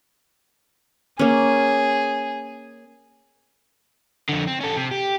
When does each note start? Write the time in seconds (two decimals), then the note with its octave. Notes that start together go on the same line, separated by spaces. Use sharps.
1.19 A#3 C#4 G#4
4.29 F2 D3
4.47 C4
4.60 C#4 A4
4.76 C3
4.91 G4